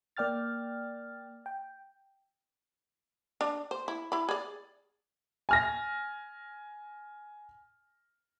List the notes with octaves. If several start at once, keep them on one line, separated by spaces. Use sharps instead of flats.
A#3 D5 G5 F6 A6
G5
D4
C5
E4
E4 B5
G#4 D5
G#5 F6 A#6